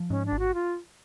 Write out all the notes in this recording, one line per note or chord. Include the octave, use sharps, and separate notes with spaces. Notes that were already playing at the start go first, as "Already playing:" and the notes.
Already playing: F3
G#2 C#4
D4
G#1
F#4
F4